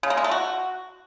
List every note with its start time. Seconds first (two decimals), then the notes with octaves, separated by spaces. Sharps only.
0.03 C#3
0.10 A#3
0.17 G#3
0.24 A3
0.31 F#4